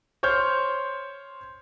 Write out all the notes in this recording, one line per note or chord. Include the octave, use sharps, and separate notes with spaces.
C5 C#5 F6 G6